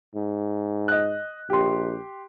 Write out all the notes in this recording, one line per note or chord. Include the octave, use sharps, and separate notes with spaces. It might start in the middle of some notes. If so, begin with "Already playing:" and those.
G#2
D#5 F#6
A#1 G4 C6